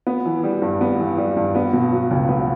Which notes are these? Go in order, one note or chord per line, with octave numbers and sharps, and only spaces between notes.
B3
E3
G3
G2
B3
E3
G3
G2
B3
B2
F#3
C#2
B3